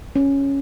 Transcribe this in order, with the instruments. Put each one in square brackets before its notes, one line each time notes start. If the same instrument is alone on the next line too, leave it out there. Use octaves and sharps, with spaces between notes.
[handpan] C#4